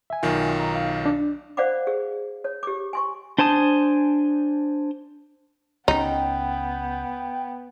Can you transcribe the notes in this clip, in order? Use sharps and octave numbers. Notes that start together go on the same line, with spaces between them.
E5 G#5
B1 D#3 F4
A#5
F5
D4
C5 D5 F5 F#5 B5 D6
G#4
C#5
G4 D6
G#5 C6 C#6
D4 C5 G#5 A5 D#6
C#2 F3 B3 C#4 D#4 G5